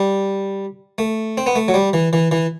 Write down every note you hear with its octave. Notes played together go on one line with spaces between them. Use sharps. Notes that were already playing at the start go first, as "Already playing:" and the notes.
Already playing: G3
A3
C4
B3
A3
F#3
G3
E3
E3
E3